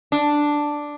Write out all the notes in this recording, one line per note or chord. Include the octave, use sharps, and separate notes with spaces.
D4